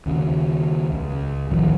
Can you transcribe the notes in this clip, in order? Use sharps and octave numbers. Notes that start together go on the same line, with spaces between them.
D#2 C#3
C#2
A1 D2 D#3 F3